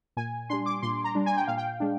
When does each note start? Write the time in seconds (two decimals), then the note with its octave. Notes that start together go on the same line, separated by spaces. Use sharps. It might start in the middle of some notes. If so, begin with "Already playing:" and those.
0.17 A#2 G#5
0.50 G3 D4 C6
0.66 D6
0.82 A#2 C6
1.04 A#5
1.15 G3 D4
1.26 G#5
1.37 G5
1.47 A#2 F5
1.57 G5
1.80 G#3 D4